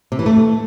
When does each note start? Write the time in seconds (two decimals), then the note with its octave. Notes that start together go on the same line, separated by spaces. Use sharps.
0.12 C3
0.19 E3
0.26 A3